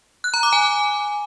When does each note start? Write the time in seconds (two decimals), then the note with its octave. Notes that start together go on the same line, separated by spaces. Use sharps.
0.24 F#6
0.34 A#5
0.43 D6
0.53 G#5